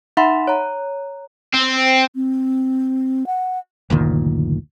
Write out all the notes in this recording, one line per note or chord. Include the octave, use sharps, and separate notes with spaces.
D#4 E5 F#5 B5 C6
C#5 A#5
C4
C4
F#5
F#1 D2 A#2 D#3